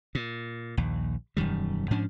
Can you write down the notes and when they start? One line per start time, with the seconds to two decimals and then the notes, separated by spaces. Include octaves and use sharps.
0.15 A#2
0.77 A#1 D#2
1.37 E1 F#2 D#3 G3
1.91 G#2 F3 C#4 D4